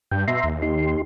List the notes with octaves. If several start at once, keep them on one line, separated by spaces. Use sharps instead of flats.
G2 G5
B2 E5 A#5 C6
D#2
D#4 G4 C6